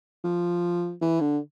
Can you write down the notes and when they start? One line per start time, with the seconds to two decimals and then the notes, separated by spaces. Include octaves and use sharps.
0.24 F3
1.01 E3
1.20 D3